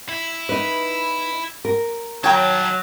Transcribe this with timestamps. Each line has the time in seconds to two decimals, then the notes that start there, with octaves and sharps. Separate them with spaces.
0.09 E4
0.49 D#4 B4
1.65 A#4
2.24 D#3 F#3 C#5 G5 A5 A#5